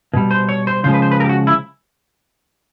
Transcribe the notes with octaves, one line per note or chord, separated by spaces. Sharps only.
B2 G3
C5
C#5
C5
C#3 F3 G#3 C5
B4
C5
B4
A#4
G4
F#4
E4